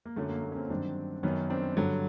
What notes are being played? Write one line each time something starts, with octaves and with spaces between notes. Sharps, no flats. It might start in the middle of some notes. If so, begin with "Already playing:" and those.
A#3
F#2 D3 F#3 A3
A#3
A#3
C#4
A#3 C4
G2 D#3 F#3 C4 D4
F#2 D#3 F#3 B3 C#4
C4 D4
G2 D3 F#3